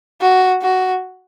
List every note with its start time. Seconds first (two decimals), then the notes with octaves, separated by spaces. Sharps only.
0.21 F#4
0.62 F#4